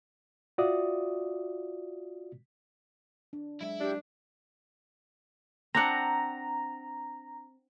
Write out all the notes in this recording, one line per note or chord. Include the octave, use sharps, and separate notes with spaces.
F4 F#4 D5 E5 D#6
D4
F#3 G#3 E4 E5
D4 G4
C4 D4 F#5 A#5